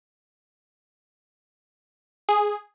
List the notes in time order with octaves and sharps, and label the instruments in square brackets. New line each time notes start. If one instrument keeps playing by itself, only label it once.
[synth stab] G#4